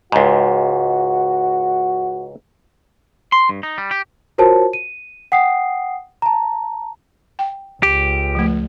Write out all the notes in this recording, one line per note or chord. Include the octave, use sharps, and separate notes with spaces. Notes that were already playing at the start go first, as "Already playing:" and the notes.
C#2 G#2 F#4
C6
G2
D#4
G3
G4
F4 F#4 A#4 C5 C#5 A5
D#7
F#5 G5 D#6 C7
A5 A#5
G5
C#2 G4
F3 A3